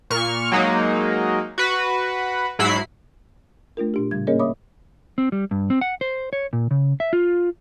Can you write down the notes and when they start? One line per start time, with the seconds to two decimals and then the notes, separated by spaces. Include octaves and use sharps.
0.10 A#2 C#6 F6
0.52 F#3 G#3 A#3 D#4
1.58 F#4 B4
2.59 G#2 F#3 E4 B5 C7
3.77 A3 D4 F4 A#4
3.94 A#2 D4 G4
4.11 A2 C#3 G3 G#6
4.27 A#3 C#4 G#4 A#4 C#5 D#5
4.39 C#5 E5 B5 D6 D#6
5.18 C4
5.32 G3
5.51 G2
5.70 C4
5.81 F#5
6.01 C5
6.33 C#5
6.53 A#2
6.71 C#3
7.00 E5
7.13 F4